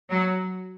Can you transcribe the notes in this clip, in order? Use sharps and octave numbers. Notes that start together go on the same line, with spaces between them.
F#3